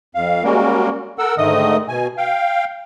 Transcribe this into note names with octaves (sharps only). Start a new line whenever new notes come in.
F2 F5
G3 G#3 A#3 C#4 F#4 A#4
A4 A#4 F#5 E6
G#2 D3 D#3 A3 D#5 D#6
B2 G#5
F5 G5